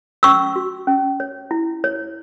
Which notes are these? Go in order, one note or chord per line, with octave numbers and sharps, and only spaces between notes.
C#4 C#6 E6
F#4
C#4
C#5
E4
C#5